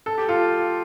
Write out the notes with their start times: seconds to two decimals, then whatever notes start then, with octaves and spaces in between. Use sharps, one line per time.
0.06 A4
0.18 G4
0.28 F4 A4